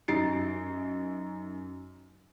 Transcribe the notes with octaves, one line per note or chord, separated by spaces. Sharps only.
F#2 D#4 A6 C7 D7